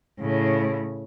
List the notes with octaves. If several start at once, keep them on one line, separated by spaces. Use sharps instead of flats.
A2 C#3